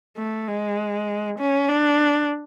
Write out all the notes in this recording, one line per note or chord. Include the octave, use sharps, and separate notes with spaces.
A3
G#3
C#4
D4